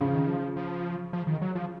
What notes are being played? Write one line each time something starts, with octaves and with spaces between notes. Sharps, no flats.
C#3 F3
D#3
F3
F3
F3
D#3
F#3
F3